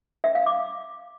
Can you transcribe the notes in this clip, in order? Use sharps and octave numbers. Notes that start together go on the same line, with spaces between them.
E5
F5
D6